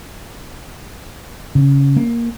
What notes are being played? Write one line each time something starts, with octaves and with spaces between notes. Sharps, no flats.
C#3
A#3